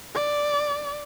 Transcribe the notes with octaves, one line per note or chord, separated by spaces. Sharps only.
D5